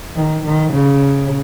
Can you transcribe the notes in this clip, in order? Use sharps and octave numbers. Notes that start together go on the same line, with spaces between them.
D#3
D#3
C#3